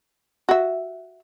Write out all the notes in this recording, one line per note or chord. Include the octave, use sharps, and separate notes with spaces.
F#4 E5